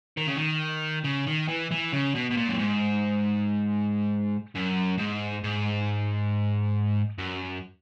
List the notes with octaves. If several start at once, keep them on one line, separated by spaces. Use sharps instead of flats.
D#3
C#3
D#3
C#3
D#3
E3
E3
C#3
B2
B2
A#2
F#2
G#2
F#2
G#2
G#2
F#2